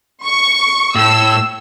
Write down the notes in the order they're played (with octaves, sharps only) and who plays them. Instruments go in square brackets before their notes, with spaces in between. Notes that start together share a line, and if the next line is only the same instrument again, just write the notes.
[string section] C#6
[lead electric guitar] A2 [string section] E6